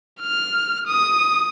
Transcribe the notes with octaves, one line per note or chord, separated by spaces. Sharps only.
F6
D#6